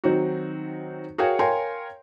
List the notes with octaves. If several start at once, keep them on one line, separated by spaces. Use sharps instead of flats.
D#3 F#3 C4 D#4 F#4
F#4 G#4 A#4 C#5 F5 G5
A#4 C#5 F5 G5 G#5 C6